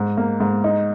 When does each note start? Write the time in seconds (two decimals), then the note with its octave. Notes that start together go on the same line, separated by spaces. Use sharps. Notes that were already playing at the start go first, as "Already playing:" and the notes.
Already playing: G#2
0.17 A#3
0.40 G#2
0.64 D#4